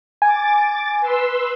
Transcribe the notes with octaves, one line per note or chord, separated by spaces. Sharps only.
G#5 D6 A6
B4 C6 E6